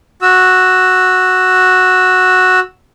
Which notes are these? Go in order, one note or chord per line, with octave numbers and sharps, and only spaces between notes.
F#4 E6